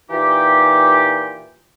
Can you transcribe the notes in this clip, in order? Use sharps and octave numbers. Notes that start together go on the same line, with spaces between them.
A#2 E3 D#4 F4 G4